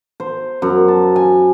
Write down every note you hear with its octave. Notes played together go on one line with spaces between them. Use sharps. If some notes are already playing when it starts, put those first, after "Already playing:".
C5
F#2
A5
G#5